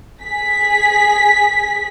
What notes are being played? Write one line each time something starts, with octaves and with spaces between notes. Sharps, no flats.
G#4 B6